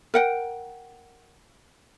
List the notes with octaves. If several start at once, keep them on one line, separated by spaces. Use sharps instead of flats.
A#4 F#5 G5